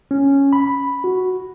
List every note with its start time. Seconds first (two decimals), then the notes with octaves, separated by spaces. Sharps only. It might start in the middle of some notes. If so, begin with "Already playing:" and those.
0.11 C#4
0.53 B5
1.04 F#4